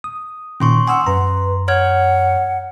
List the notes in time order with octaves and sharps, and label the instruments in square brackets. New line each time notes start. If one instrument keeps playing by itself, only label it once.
[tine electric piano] D#6
[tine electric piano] A#2 D#3 [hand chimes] C#4 C6 C#6
[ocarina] F#5 [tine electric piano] G#5 D#6 E6 [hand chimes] C6
[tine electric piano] F#2 A#5 [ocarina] B4
[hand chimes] C#5 F6 G#6 [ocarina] F#5